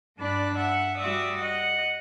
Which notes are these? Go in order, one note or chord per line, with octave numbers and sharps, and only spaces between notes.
G2 D4 D5 B5 F#6
E5 F#5 F#6
G3 F#4 D5 E5 D#6
D#5 F#5